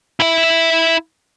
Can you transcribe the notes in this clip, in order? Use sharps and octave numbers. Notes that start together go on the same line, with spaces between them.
E4 E5